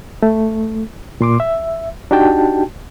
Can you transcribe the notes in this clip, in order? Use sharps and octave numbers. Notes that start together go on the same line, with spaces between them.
A3
A#2 C6 D6
E5
D4 D#4 F#4 G4 G5 A5